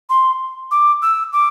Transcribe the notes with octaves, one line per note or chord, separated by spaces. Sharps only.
C6
D6
E6
D6